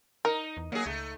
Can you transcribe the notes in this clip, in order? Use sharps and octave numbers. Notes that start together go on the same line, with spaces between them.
D#4 A#4
E2
F#3 A#3 G#4
C#2 A3